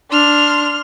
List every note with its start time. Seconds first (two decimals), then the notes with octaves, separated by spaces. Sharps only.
0.11 D4 C6 F6